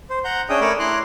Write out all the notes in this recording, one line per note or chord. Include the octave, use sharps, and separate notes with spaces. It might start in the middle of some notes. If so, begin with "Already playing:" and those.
C5
F#5 A#5 G6
C#4 D4 G#4 E5 G5 D#6
A3 A#4 C#5 B5 D6 E6
E4 A#5 C6 D6 F#6